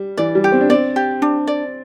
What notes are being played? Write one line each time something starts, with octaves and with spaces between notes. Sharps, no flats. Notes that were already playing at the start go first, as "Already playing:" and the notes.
Already playing: G3
E3 D5
G3
G4
C4
D4
C4 D5
G4
D4
D5